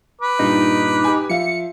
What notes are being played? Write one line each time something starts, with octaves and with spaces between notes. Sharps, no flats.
B4 D6
G2 A#2 G3 D#4
G4 G#5
F3 E5 F5 C#7